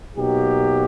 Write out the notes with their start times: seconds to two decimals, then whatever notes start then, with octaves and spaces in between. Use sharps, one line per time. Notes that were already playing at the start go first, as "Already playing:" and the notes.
0.17 B2 F#3 A#3 D#4 G4